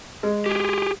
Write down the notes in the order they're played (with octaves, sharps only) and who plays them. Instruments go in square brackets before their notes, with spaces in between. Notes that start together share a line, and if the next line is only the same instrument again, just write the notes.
[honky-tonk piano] G#3
[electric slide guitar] G4 G#4